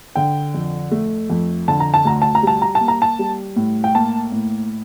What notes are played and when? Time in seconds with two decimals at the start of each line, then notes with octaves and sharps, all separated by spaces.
0.15 D3 G5
0.54 F2
0.91 A3
1.30 F2
1.68 D3 A5
1.80 A#5
1.94 A5
2.05 D2 A#5
2.22 A5
2.35 A#5
2.43 G3 A5
2.62 A#5
2.75 A5
2.81 A#3
2.88 A#5
3.02 A5
3.19 G3
3.56 A2
3.84 G5
3.95 A#3 A5
4.32 A2